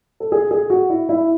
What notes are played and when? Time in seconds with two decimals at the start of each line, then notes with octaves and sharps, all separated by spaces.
0.20 A4
0.32 G#4
0.51 G#4
0.70 F#4
0.90 E4
1.09 E4